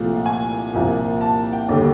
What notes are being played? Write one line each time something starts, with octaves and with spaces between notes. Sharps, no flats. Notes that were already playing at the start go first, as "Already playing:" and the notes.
Already playing: C2 A#2 F3 A3
G#5
C2 A#2 F3 A#3
A5
G5
D#2 D3 G3